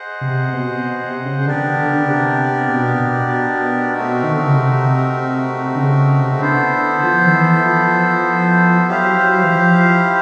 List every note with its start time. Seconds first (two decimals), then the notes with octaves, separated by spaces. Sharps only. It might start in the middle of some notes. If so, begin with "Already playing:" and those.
Already playing: G#4 C5 D#5 F#5
0.21 C3
0.53 B2
0.84 B2
1.04 C3
1.25 C#3
1.45 D3 B3 D4 G4 A#4 D5
1.61 D3
1.76 D3
1.92 D3
2.03 C#3
2.08 C3
2.69 B2
3.00 B2
3.92 A3 C4 D#4 F#4 A#4
4.23 D#3
4.34 D3
4.45 C#3
4.56 C3
5.75 D3
5.78 C#3
6.20 C3
6.31 C#3
6.40 D3 B3 E4 A4 C5
7.03 F3
7.26 D#3
7.33 E3
7.65 F3
8.88 F#3 E4 G4 C5 F5
9.43 E3
9.50 F3